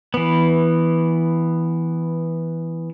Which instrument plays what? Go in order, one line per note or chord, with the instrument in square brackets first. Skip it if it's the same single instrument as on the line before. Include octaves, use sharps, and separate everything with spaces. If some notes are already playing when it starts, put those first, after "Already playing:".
[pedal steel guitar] E3 B3